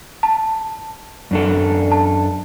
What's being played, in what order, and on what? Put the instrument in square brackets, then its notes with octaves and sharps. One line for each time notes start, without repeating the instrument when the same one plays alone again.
[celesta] A5
[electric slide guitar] F#2 D4 A4
[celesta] A5